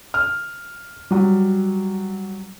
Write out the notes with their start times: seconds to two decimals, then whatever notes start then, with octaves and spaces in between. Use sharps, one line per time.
0.14 F6
1.11 F#3 G3